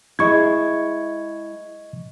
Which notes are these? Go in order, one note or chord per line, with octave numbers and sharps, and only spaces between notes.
G#3 E4 D#5 C#6 G#6